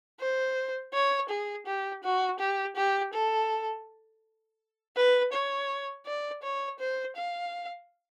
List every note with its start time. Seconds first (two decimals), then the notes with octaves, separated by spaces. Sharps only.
0.19 C5
0.94 C#5
1.29 G#4
1.66 G4
2.03 F#4
2.40 G4
2.76 G4
3.13 A4
4.96 B4
5.33 C#5
6.06 D5
6.43 C#5
6.79 C5
7.16 F5